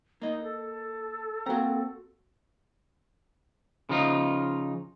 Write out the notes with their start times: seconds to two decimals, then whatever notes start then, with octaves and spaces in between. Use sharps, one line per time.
0.22 A#3 D#4 D#5
0.43 A4
1.46 A#3 C4 F#4 A#5
3.89 C#3 F3 D#4 F4